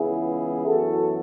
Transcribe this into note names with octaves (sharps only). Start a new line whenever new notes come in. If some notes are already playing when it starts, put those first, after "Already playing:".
Already playing: C#2 C#3 E3 B3 E4 G#4
F#2 E3 B3 F#4 A4